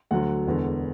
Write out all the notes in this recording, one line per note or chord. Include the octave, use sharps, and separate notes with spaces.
D2 D3 F#3 F#5
E1 E2 D3